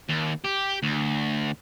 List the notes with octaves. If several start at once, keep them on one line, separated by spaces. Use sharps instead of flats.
D#2
G4
D2